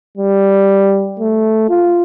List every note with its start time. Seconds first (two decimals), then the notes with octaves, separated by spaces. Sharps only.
0.17 G3
1.20 A3
1.69 F4